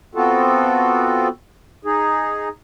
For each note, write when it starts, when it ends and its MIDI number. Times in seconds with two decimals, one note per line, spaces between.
0.15 1.28 59
0.15 1.28 60
0.15 1.28 65
0.15 1.28 66
0.15 1.28 69
1.85 2.49 63
1.85 2.49 68